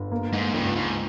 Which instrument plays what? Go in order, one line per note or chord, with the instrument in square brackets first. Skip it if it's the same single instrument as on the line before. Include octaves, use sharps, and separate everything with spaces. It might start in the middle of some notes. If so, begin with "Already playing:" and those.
Already playing: [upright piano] G1
A#3
[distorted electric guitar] G#2
[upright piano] C#2 [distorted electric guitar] G2
[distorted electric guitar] G#2